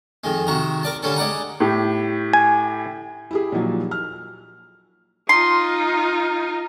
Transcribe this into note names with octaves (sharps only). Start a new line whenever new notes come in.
F2 D#3 G#3
C3 D#3 F#4 A#5
A#4 D5 A5
D3 G3 C#4 A4
G#3 D5 F#5 A#5
A2 G4
G#5
E4 G4 G#4
A#2 D#3 F3 F#3
F6
D#4 F4 C6